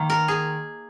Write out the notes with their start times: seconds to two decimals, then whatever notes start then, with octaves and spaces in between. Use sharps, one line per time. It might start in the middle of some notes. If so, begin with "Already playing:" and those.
Already playing: D#3 A#3
0.10 A#4
0.28 G#4